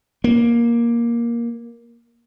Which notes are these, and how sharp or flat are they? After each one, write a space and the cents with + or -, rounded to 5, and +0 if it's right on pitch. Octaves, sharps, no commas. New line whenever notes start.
A#3 +10